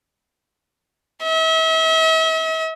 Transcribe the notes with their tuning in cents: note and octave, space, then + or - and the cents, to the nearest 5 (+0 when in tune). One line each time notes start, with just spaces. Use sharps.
E5 -40